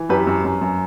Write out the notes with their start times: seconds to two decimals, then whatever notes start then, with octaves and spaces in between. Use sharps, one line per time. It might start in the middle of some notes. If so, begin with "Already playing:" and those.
Already playing: E3
0.09 F#2 G4 B4
0.27 F#2
0.45 F#2
0.61 F#2